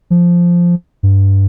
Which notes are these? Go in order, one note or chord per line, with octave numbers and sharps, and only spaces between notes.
F3
G2